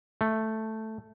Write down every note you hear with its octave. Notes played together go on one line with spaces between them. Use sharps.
A3